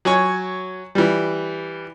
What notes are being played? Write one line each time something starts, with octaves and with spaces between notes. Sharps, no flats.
F#3 C#5 G#5 C#6
E3 G3